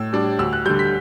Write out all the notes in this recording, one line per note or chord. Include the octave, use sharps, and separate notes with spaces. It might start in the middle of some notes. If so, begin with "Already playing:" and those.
Already playing: A2 E6
G3 D4
D2 E6
F#6
D3 G3 G6
B6